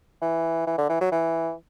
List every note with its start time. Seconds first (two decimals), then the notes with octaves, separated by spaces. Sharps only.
0.22 E3
0.67 E3
0.78 D3
0.89 E3
1.01 F#3
1.12 E3